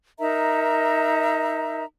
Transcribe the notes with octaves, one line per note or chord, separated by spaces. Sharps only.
D#4 A#4 E5 A#5